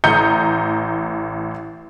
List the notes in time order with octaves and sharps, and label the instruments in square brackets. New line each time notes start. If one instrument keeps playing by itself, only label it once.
[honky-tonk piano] A1 A#5 D#6 G6 C#7